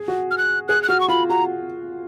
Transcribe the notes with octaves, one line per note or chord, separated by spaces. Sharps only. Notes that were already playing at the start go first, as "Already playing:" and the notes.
Already playing: G#4
F#4
F6
F#6
G#4 F#6
F#6
F#4 F6
C#6
F4 B5
F#4 A#5